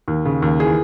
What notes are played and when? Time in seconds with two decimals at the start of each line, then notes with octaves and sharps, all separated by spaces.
0.08 D#2
0.25 C#3
0.42 D#2
0.60 E3 G#4